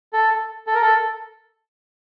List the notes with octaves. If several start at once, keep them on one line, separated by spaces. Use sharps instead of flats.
A4
A4
A#4
A4